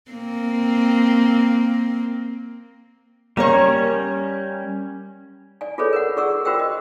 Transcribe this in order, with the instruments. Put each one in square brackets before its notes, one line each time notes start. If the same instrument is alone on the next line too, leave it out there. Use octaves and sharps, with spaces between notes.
[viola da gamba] A#3 C4
[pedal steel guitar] G3 C#4 [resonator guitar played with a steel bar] A#3 A#4 C#5
[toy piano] D5 G#5
F4 G#4 A4 B4 C#5 D5
A#4 D5 F#5
G#4 D5 F#5 C#6 E6
F4 F#4 A#4 C5 G5 E6
D#5